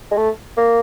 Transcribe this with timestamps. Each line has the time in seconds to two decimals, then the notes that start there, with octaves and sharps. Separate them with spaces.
0.11 G#3
0.17 A3
0.57 A#3